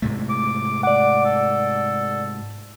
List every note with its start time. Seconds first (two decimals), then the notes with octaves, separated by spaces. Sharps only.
0.02 G#2 C3 A3
0.30 D6
0.83 D5 F#5 D6
1.25 A4